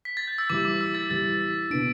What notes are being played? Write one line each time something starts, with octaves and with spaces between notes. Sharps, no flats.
B6
A6
G6
E6
E3 G3 E4 D6
D6
E6
A6
E3 G3 E4 A6
B6
B2 B3 D4 D7